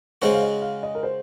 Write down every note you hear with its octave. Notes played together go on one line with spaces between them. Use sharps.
C#3 G#3 C#4 F#4 C5
F5
D#5
F5
D#5
A#4
C5